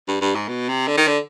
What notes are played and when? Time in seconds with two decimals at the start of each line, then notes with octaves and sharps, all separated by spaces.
0.08 G2
0.21 G2
0.35 G#2
0.48 B2
0.69 C3
0.87 D3
0.97 D#3
1.07 D3